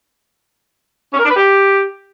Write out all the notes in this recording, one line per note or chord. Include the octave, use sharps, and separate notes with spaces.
C#4
A#4
D4
B4
G4